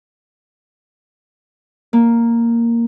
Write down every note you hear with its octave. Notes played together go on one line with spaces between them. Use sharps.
A#3